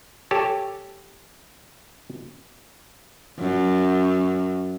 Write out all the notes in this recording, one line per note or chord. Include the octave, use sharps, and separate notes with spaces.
G4 A4 C#5 G#5 A5
F#2